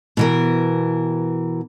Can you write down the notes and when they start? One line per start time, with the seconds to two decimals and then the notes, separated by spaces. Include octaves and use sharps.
0.17 B2 E3 A#4